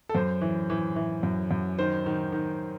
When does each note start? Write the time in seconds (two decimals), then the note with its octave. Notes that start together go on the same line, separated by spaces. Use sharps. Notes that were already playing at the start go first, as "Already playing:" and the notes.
0.09 A4
0.15 F#2 C5
0.41 E3
0.70 E3
0.96 E3
1.23 F#2
1.51 F#2
1.79 D#3 C5
2.06 D#3
2.32 D#3